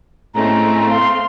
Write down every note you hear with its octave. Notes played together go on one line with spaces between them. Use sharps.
A2 G#3 A3 C4 C#4 A#5
F5 C6